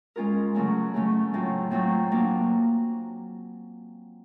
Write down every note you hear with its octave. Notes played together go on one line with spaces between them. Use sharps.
G#3 C#4 F4 A#4
C#3 F#3 A3 C#4
C#3 F#3 A3 C#4
A2 F#3 A3 C4 F4
A2 F#3 A3 C4 F4
F#3 A#3 D4